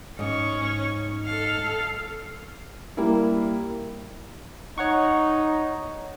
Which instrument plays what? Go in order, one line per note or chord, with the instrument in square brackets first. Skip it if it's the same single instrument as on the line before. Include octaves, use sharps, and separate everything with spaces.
[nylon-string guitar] G#2 [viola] C#4 C#6
[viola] A4 F5
[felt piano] G3 A#3 E4
[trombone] D#4 [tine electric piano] C#5 F#5 C#6